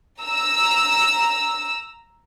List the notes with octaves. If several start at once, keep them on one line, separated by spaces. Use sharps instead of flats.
A#5 E6